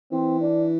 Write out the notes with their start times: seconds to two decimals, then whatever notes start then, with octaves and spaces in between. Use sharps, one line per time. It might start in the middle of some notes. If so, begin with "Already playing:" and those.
0.12 E3 C4
0.41 D4